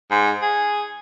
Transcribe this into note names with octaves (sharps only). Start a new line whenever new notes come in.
G#2
G#4